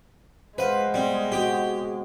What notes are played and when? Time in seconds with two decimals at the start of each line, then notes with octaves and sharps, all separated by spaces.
0.58 G#3 B4 C5 F5 F#5
0.94 G3 B3 C4
1.32 A#3 C4 F#4 G4